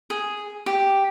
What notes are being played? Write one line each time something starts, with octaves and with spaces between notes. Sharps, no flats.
G#4
G4